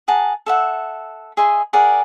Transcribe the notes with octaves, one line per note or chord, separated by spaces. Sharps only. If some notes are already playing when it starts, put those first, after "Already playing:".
G#4 F#5 A5 A#5
A4 E5 F#5
G#4 D#5 E5 C6
G#4 A#4 D5 F#5